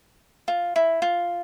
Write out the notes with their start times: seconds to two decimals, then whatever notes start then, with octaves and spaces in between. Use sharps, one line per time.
0.48 F4
0.76 E4
1.02 F4